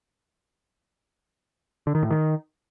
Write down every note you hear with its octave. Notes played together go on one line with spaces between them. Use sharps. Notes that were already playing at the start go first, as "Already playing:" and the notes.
D3
D#3
A2
D#3